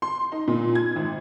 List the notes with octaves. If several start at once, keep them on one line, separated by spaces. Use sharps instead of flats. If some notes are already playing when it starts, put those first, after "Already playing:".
C6
D#4
A#2
G#6
G#1